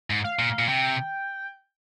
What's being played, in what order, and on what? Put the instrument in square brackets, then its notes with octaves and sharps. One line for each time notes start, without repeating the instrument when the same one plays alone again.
[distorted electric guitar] G#2
[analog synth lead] F5
[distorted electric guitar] A#2
A#2
[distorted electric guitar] C3 [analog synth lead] G5